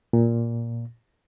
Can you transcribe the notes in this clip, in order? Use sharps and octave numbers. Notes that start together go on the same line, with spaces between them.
A#2